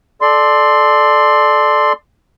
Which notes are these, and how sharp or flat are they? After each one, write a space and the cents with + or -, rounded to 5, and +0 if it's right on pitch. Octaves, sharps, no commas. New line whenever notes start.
A4 -20 D5 +15 C6 +0